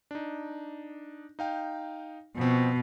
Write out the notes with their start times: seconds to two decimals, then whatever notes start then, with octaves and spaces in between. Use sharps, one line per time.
0.11 D4 D#4
1.39 D#4 F5 G5
2.37 B2 F3 C4